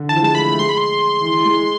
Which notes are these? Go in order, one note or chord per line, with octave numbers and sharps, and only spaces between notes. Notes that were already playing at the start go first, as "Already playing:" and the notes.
Already playing: D3
E3 A5
F3
G#3 A5
A3 B5
A3
G#3 C6
B5
C6
E3
E3
G#3